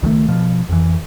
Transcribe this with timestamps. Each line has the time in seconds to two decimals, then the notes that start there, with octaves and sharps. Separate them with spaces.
0.03 C#2 D#3 E3 A3
0.28 B2 F3
0.69 F2 E3